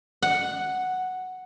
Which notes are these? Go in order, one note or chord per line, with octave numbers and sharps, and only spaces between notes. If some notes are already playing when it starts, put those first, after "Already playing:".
F#5